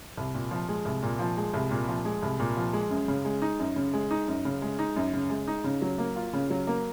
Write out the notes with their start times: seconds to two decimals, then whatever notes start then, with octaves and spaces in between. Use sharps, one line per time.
0.17 C2
0.34 A#2
0.51 F3
0.69 G#3
0.85 C2
1.03 A#2
1.19 F3
1.37 G#3
1.54 C2
1.71 A#2
1.88 F3
2.05 G#3
2.23 C2
2.40 A#2
2.57 F3
2.73 G#3
2.90 F#2
3.08 C#3
3.25 G#3
3.42 D#4
3.59 F#2
3.76 C#3
3.93 G#3
4.11 D#4
4.28 F#2
4.45 C#3
4.62 G#3
4.79 D#4
4.96 F#2
5.13 C#3
5.30 G#3
5.48 D#4
5.64 C#3
5.82 F#3
5.98 A#3
6.16 F4
6.33 C#3
6.50 F#3
6.67 A#3